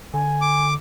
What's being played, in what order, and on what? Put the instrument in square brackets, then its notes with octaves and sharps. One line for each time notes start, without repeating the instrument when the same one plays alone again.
[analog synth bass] D3 [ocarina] G#5
[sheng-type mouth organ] D6